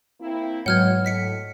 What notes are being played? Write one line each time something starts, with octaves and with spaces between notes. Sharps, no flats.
A#3 C4 E4
G#2 B2 F#3 C#5 F#5 F6 G#6
A2 D#5 B6 C#7